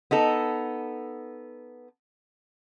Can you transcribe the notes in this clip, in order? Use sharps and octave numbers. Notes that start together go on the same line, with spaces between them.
B3 D#4 A4